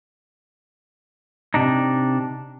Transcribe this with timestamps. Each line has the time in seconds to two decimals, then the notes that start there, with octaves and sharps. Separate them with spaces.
1.54 C3 D4 D#4